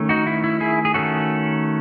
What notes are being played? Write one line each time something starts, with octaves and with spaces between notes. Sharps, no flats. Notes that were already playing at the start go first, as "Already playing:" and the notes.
Already playing: D#3 A3 C#4
D#4 F#4
E4
E4
E4 G#4
G#4
D#3 A3 C#4 F#4 A4